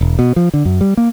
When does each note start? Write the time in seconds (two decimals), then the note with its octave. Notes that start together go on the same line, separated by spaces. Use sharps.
0.01 E1
0.19 B2
0.36 F3
0.54 D3
0.65 F#2
0.81 G3
0.97 A#3